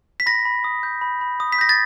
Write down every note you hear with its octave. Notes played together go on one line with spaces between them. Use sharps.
B6
B5 A#6
B5
D#6
G6
B5
B5
D#6
B6
G6 A#6
A6